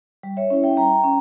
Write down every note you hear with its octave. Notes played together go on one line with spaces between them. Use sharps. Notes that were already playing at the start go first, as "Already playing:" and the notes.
G3
C#5 E5
C#4 E4
E5 G5
G3 G5 A#5
C#4